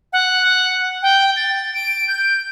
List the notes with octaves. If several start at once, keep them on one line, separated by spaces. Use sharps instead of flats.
F#5
G5
A6
D7
G6